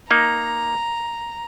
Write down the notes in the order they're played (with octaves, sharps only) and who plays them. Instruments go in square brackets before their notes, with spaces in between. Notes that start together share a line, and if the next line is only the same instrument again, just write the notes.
[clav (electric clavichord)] A#3 D#4 [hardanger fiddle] A#5